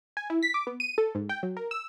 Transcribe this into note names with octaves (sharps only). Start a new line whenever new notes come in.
G#5
E4
B6
D6
B3
D#7
A4
G#2
G5
F#3
A#4
E6